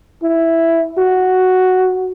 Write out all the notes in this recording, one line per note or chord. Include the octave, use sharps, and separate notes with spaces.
E4
F#4